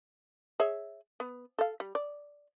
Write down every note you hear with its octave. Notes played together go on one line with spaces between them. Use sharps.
G#4 C#5 E5
B3
A4 F5
G3
D5